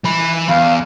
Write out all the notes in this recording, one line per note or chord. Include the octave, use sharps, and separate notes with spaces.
E3 B5
E2 F5